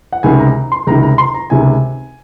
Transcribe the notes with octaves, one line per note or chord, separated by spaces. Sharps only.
F#5
C#2 C3 D#3 G#5
A#5
C6
C#2 C3 D#3 A#5
A#5
C6
A#5
C#2 C3 D#3 G#5